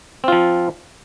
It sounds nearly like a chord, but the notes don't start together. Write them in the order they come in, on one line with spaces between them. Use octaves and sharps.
C4 F4 F3